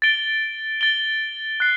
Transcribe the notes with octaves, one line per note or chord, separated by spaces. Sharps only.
A6 D7 G7
A6 D7 G7
F#6 C7